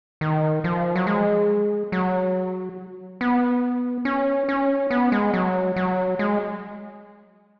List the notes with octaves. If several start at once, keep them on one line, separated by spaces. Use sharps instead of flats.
D#3
F3
F#3
G#3
F#3
B3
C#4
C#4
B3
G#3
F#3
F#3
G#3